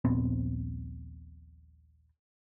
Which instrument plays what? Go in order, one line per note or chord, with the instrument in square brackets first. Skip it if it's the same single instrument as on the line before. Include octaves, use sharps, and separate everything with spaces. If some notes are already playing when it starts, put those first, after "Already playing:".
[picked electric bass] D#1 A#1 B3 C4